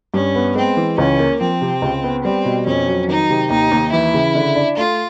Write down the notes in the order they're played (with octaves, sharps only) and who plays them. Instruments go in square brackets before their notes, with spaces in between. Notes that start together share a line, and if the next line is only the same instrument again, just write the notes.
[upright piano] G2 [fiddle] C#4
[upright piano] B3
[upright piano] G#3 [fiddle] C4
[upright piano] E3
[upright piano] C#2 [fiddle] C#4
[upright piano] A#3
[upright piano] F3 [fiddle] C4
[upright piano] C3
C#2
B3
[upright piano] G3 [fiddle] C4
[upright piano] B2
[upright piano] F2 [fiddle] C#4
[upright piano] F#3
[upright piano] D#3 [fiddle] D#4
[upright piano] C3
[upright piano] D#2 [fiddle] D#4
[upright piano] D#2
[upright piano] E3 [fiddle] E4
[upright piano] C#3
D3
D4
[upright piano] A3 [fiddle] F4